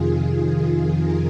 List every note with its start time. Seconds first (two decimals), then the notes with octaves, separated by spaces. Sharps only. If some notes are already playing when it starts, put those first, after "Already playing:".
Already playing: F2 C3 D#3 F4 G#4
0.99 A#4